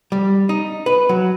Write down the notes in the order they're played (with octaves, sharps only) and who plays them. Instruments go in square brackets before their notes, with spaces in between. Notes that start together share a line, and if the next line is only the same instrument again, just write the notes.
[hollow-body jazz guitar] G3
D#4
B4
F#3